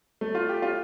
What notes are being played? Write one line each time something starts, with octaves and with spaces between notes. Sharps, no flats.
A3
F4
G4
F4